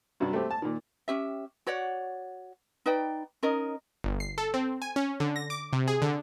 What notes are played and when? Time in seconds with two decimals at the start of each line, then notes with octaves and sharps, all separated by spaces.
0.20 G2 C3 F#3 G3
0.33 A3 C4 G4
0.51 A5
0.62 A#2 D#3
1.08 C#4 G4 E5
1.67 F#4 C#5 D5 F#5
2.86 D#4 B4 D5 G5
3.43 C#4 D#4 A#4 D#5
4.04 G1
4.20 C7
4.38 A4
4.54 C4
4.82 G#5
4.96 C#4
5.20 D3
5.36 A#6
5.50 D6
5.73 C3
5.88 G#4
6.02 D3